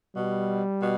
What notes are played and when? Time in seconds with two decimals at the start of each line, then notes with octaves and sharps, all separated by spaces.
0.15 B2 G3
0.82 B2